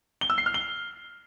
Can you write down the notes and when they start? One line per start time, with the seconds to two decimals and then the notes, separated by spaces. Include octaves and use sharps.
0.21 G7
0.30 E6
0.38 C7
0.46 F6
0.54 G7